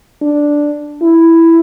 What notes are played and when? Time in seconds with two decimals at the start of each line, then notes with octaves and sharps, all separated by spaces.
0.22 D4
1.02 E4